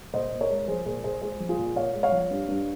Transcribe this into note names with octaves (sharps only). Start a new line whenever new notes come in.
A#2 C5 D#5
A#2
A#4 C#5
G#3
F3 G#4 C5
A#2 G#4 C5
A#2 G#4 C5
G#3 G#4 C5
F3
F4 G#4
A#2
A#2 C#5 F5
G#3
C#5 F5
F3
G2
G2